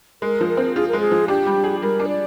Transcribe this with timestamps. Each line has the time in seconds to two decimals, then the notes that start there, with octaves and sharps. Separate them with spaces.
0.22 G#3 A#4
0.41 F3
0.48 A#4
0.57 C4
0.76 F4 G#4
0.88 A#4
0.93 G#3
1.00 G#4
1.12 F3
1.28 D4 G4
1.46 G3
1.64 G#4
1.82 G3 A#4
2.00 D4
2.08 D5